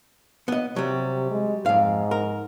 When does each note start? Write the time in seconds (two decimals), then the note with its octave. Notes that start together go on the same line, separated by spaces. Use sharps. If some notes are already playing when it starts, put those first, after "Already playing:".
0.48 B3 D#5
0.76 C3 F#3 G3
1.30 G#3
1.66 F2 G#2 F5
2.11 A#4